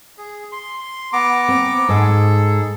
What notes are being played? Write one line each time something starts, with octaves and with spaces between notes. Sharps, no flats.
G#4
C6
B3 A#5 D6
C4
G#2 G#4 A4